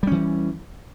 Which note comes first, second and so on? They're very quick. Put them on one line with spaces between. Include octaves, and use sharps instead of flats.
G3 C#4 E3